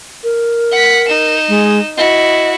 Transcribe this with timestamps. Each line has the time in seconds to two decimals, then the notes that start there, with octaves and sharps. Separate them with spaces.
0.24 A#4
0.71 F#5 B6
1.08 D#4 E7
1.48 G#3
1.97 E4 F#4 D#5